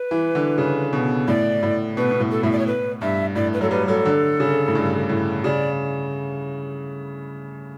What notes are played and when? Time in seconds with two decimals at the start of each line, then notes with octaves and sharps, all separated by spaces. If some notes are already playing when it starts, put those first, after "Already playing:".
Already playing: B4
0.11 E3
0.35 D3
0.58 C#3
0.93 B2
1.28 A2 D5
1.63 A2
1.97 B2 B4
2.11 B2
2.20 A2
2.31 A4
2.43 A2 E5
2.52 D5
2.59 C#5
2.67 B4
3.02 G2 E5
3.36 A2 D5
3.53 B4
3.61 F#3 A4
3.71 G3 B4
3.88 F#3 A4
4.05 D3
4.40 C#3
4.68 A2
4.75 G2
5.09 A2
5.44 C#3 D5